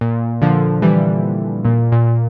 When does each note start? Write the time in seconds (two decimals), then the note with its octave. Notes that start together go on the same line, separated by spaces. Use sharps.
0.01 A#2
0.42 D3 F3
0.82 E3 G3
1.65 A#2
1.92 A#2